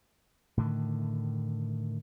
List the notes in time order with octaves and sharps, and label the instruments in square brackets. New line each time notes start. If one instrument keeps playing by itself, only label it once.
[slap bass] A2 D3 D#3